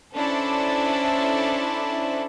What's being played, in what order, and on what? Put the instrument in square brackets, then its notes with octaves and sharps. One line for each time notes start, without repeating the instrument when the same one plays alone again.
[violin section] C#4 D4 E4 A4 C5 D5